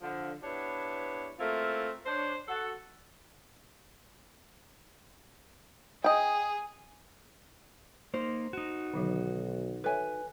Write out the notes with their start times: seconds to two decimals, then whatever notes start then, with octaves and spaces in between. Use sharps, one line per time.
0.01 D3 F3
0.43 B3 D4 E4 G4 B4 C#5
1.39 A3 A#3 C4 E4 F4
2.06 D4 C5 C#5
2.48 F#4 A4 F#5
6.04 G#4 D#5 G5
8.14 A#3 D#4 C5
8.53 D#4 F#4
8.94 B1 D3 D#3 F#3
9.84 A4 B4 C#5 E5 G#5